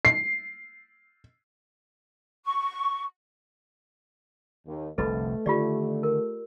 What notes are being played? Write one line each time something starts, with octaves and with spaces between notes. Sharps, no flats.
C7
C#6
D#2
F1 C2 D3 A3 A4 B4 D#5
D3 D#3 F4 G4 D5
A#4